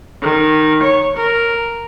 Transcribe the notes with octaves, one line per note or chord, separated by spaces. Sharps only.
D#3
C#5
A#4